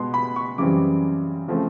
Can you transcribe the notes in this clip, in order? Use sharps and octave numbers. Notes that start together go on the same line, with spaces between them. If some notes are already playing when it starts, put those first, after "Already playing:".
Already playing: B2 G#3 B3 C6
B5
C#6
F#2 C#3 E3 G3 C4 D6
C#3 F3 A3 C4